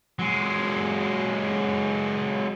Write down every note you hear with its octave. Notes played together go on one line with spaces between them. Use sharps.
F#3 G#3